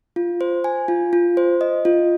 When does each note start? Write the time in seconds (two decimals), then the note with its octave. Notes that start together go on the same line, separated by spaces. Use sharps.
0.16 F4
0.41 C5
0.64 G#5
0.88 F4
1.13 F4
1.37 C5
1.61 D#5
1.85 F4